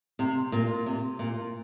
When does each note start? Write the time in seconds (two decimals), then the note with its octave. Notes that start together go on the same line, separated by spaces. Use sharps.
0.19 C3
0.52 A#2
0.86 C3
1.19 A#2